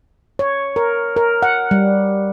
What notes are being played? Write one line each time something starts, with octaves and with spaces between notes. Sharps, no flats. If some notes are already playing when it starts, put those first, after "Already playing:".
C#5
A#4
A#4
F#5
G3